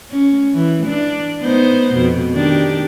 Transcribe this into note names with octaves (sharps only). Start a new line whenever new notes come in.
C#4
E3
D4
B3 D#4 C5
F2 B2
D#3 D4 G4